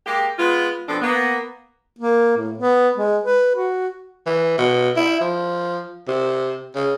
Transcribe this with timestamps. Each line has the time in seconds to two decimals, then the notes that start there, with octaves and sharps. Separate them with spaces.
0.06 G#3 A#3 G4
0.38 G#3 B3 F4
0.88 B2 F3 C4 D4 A4
1.01 A#3 B3
1.99 A#3
2.37 A2
2.58 B3
2.97 G#3
3.24 B4
3.56 F#4
4.26 E3
4.58 B2
4.96 E4
5.21 F3
6.07 C3
6.75 C#3